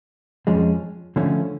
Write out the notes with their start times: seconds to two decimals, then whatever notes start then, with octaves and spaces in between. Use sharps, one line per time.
0.47 F2 F3 G#3 C#4
1.16 D3 F3 A3 C#4